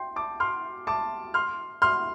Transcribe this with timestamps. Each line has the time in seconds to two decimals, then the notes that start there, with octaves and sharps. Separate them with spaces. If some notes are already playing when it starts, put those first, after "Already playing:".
Already playing: G5 C6
0.16 A5 D6
0.40 C6 F6
0.87 A5 D6
1.34 C6 F6
1.82 C6 F6